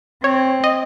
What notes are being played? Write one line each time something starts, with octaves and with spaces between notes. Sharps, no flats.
C4 C#5
D#5